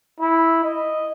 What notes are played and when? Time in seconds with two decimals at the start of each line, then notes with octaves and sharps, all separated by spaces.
0.20 E4
0.64 D#5